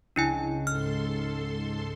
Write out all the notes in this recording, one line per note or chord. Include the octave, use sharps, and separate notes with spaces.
C#2 D4 E4 G#5
G#2 A4 C6 F6